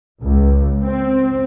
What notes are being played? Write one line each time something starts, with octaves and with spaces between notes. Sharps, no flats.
C#2
C4